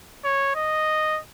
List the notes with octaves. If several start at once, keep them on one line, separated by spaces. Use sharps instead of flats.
C#5
D#5